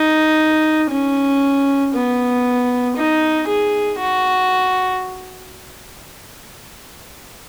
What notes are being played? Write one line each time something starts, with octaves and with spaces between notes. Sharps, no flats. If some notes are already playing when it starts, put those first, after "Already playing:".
Already playing: D#4
C#4
B3
D#4
G#4
F#4